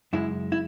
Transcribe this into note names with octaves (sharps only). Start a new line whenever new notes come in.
F#2 C#3 G#3 E4
E4